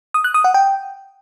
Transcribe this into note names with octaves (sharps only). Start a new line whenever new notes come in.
D#6
F#6
D#6
F#5
G5